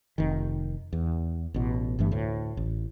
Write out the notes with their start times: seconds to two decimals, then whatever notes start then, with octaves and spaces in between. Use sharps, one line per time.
0.18 F1 D#3
0.93 E2
1.54 A1 B2
1.99 G1 G2 E3 A3
2.12 D2 A2
2.57 A1